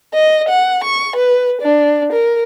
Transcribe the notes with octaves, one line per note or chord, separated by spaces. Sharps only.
D#5
F#5
C#6
B4
D4
A#4